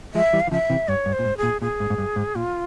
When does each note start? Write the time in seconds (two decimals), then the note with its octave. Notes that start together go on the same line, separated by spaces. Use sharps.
0.14 F3 G#3 E5
0.33 E3 G3
0.40 F5
0.47 E3
0.51 C#3 F3 E5
0.70 C3 E3
0.88 G2 C#5
1.06 G2
1.13 C5
1.19 A#2
1.25 G#2
1.37 G#4
1.43 A#2
1.61 A#2 G#4
1.80 G#2
1.90 G#2
1.98 G2
2.16 G#2
2.35 A#2 F4